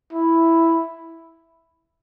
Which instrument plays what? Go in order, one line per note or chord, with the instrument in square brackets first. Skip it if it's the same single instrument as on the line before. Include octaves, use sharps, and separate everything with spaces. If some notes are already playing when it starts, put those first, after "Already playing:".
[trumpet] E4